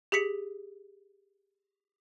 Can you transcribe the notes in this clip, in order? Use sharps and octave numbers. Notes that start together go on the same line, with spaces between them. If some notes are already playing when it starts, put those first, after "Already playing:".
G4 G#4 B6 C#7